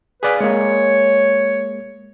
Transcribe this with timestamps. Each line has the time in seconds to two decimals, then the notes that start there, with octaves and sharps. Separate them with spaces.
0.23 G#4 B4 D5 F5
0.40 G#3 A#3 C#5